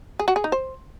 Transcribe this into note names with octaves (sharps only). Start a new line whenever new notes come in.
G#4
F#4
G#4
D#4
C5